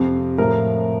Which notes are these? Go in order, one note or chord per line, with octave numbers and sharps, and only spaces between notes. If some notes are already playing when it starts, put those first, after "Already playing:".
Already playing: F2 C3 F3
A2 F3 A#4